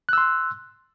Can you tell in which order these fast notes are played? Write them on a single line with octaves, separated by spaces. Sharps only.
F#6 E6 C6